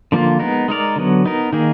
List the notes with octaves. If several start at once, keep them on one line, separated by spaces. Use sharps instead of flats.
D3 F3 A#3 F4
G#3 B3 D#4 A#4
G#3 D#4 A#4 D5
D3 F#3 B3
B3 D#4 A#4
D#3 A#3 D#4 G#4